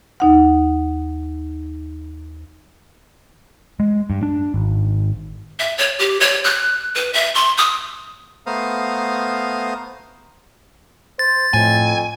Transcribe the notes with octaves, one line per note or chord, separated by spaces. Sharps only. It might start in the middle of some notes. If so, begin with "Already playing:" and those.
D#2 D#4 F#5
G#3
G2
D4
G#1
E5
C#5
G4
C#5
F#6
B4
E5
C6
D#6
A3 B3 C5 F5 A#5 D#6
C5 A6
F2 A2 G#5